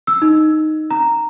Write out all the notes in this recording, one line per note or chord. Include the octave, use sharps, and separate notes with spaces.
E6
D#4
A#5